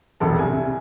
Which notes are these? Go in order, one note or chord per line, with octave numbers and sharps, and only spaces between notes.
E1 A#1 A4 A5
C2 G#5